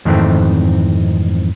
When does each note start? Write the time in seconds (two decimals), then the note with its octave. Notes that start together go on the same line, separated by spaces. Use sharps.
0.05 F2 G#2 D#3 E3 A3 C4